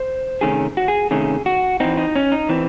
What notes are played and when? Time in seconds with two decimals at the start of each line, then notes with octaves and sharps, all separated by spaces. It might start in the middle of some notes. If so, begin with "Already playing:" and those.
Already playing: C5
0.41 C3 D#3 A3 C#4 G#4
0.77 F#4
0.88 G#4
1.11 C3 D#3 A3 C#4 G#4
1.46 F#4
1.80 E3 C4 D#4
1.97 D#4
2.16 C#4
2.32 D#4
2.49 E3 C4